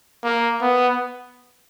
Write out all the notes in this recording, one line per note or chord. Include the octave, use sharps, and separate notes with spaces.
A#3
B3